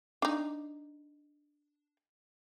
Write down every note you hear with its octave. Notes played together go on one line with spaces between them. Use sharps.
D4 D#4